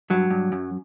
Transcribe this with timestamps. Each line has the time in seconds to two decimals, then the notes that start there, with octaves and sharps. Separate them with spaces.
0.10 G2 F#3
0.30 G2
0.52 F#2